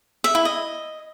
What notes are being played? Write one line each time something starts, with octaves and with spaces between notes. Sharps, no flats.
E5
E4
D#5